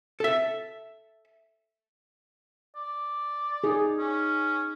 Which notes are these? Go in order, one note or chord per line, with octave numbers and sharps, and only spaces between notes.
A4 E5
D5
D#4 G#4
C#4